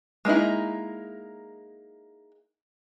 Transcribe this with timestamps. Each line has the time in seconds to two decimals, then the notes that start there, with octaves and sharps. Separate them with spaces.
0.25 G#3 A#3 D#4 E4